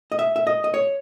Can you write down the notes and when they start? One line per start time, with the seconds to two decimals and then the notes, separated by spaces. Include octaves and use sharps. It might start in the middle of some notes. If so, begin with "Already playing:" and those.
0.12 D#5
0.19 E5
0.36 E5
0.47 D#5
0.64 D#5
0.74 C#5